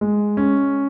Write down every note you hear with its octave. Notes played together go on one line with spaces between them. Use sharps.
G#3
C#4